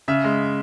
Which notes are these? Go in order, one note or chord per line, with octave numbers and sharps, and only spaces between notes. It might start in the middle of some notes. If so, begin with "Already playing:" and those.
C#3 E5
G#3